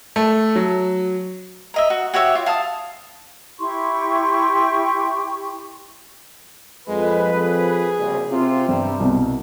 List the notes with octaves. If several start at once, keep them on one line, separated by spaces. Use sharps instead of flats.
A3
F#3
A#4 D#5 E5
F#4
F#4 G4 C#5 E5
F4
F5 A5 D#6
E4 G4 C6 C#6
F2 G#3 B4
G#4
F#1 C2
C3 C4 F4
G2 G3 C4
C2 B2